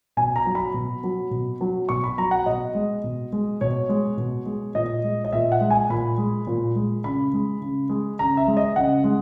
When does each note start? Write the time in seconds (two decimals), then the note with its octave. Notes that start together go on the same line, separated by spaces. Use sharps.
0.17 B2 G#5
0.36 A#5
0.46 F#3
0.55 B5
0.74 B2
1.04 F#3
1.31 B2
1.61 F#3
1.89 B2 C#6
2.04 B5
2.18 F#3 A#5
2.31 F#5
2.46 B2 D#5
2.75 G#3
3.04 B2
3.32 G#3
3.61 B2 C#5
3.89 G#3
4.17 B2
4.46 G#3
4.75 A#2 D#5
5.04 G#3
5.25 D#5
5.33 A#2 E5
5.52 F#5
5.61 G#3
5.70 G#5
5.90 A#2 B5
6.18 G#3
6.47 A#2
6.76 G#3
7.04 C#3 B5
7.33 G#3
7.61 C#3
7.89 G#3
8.19 C#3 A#5
8.37 E5
8.47 G#3
8.57 D#5
8.76 C#3 F#5
9.04 G#3